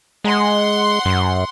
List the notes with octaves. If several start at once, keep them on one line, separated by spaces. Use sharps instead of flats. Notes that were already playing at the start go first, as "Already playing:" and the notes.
G#3 F#5 C6
F#2